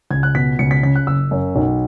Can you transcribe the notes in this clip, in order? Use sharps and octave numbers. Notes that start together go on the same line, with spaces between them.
C#2 G#6
F#6
B2 B6
C#2 C#7
B6
C#3 B6
F#6
F#1 E6
F#2
B1